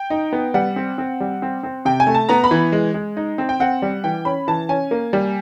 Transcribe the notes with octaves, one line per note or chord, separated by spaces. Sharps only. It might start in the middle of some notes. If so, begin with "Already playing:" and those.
Already playing: G5
D#4
B3
G3 F#5
C4
C4
G3
C4
C4
C3 G5
G#5
A3
A5
B3 A#5
B5
E3
G#3
G#3
D#4
C4
G5
C4 F#5
G3
E3 G5
C#4 B5
E3 A5
C#4 G#5
A#3
G3